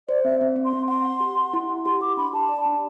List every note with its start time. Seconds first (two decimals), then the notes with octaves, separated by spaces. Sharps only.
0.08 C5 D5
0.24 C4 E5
0.41 C4
0.56 C4
0.65 C6
0.73 C4
0.88 F#5 C6
1.05 F#5
1.20 G4
1.37 F#5
1.53 E4
1.69 F#5
1.85 G4 C6
2.01 G4 D6
2.17 D4 B5
2.33 G4 A5
2.49 D5
2.65 D4